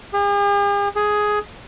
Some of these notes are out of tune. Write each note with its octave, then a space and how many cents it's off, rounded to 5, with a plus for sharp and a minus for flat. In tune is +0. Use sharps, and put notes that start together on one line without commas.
G#4 -45
G#4 +10